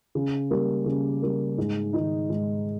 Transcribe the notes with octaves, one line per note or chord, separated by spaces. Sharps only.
C#3
G3 A#3
C#3
G3 A#3
G#2
D#3 G#3 D#4
G#2